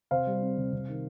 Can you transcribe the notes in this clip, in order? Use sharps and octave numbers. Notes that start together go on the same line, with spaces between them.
C3 C5 F5
G3
C4
C3
C3
D#3